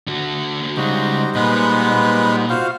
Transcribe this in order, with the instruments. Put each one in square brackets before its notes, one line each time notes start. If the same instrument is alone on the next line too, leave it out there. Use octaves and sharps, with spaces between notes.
[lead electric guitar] D3 F#4
[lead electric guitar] C#3 G#3 [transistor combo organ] G3 D#4 C5 [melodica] F#4
[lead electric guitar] A#2 [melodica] G#3 B3 B4
[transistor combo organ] F4 F#4 F5 [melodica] C5